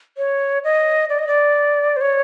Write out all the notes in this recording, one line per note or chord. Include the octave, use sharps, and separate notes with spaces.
C#5
D#5
D5
D#5
D5
C5
C#5